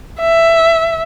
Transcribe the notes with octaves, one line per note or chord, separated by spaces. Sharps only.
E5